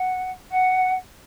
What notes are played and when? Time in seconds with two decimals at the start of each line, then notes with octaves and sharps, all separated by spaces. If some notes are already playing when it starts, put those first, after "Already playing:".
Already playing: F#5
0.51 F#5